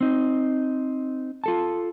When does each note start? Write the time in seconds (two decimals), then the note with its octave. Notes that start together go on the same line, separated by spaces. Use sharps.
0.01 C4 D#4
1.44 F4 A4 A5